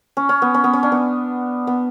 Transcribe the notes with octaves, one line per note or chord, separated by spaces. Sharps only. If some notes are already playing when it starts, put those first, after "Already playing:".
C#4
C#4
B3
C#4
B3
C#4
D4
B3
B3